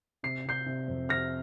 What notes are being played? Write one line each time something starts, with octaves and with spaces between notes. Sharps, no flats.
C3 C7
C3 G6 C7
C3
F2
C3 F6 A#6